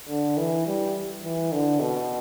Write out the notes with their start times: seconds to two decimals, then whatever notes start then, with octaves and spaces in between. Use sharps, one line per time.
0.09 D3
0.37 E3
0.67 G3
1.23 E3
1.52 D3
1.80 B2